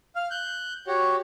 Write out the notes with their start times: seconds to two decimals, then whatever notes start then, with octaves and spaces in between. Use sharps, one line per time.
0.16 F5 F6
0.31 F#6 G6
0.87 F#4 G4 C#5